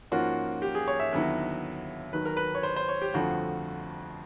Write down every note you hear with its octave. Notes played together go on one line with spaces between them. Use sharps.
G#2 F3 A#3 C#4 F4 F#4
G4
G#4
C#5
E5
D#2 D3 F#3 B3 E4
D#2 D#3 F#3 B4
A#4
B4
C#5
C5
C5
C#5
G4
G1 F2 D3 F3 A3 F#4